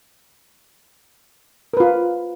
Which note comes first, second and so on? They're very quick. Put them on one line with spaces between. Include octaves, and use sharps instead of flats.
A#4 B4 F4